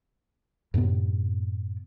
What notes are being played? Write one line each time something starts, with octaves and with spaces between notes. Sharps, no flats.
F#2 A2 C3 B3